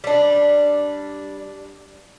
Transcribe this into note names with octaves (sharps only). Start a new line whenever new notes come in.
G3 D4